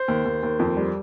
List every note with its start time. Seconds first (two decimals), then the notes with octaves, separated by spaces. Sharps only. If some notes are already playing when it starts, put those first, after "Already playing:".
Already playing: C5
0.08 D#2
0.25 D#2
0.43 D#2
0.59 F2
0.77 G3